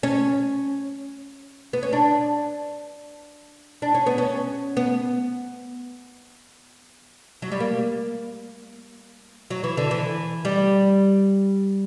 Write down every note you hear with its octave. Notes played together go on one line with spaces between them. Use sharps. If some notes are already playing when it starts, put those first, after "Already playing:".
C#4
B3
C#4
D4
D4
C#4
B3
C#4
B3
F#3
G3
A#3
F#3
E3
D3
E3
G3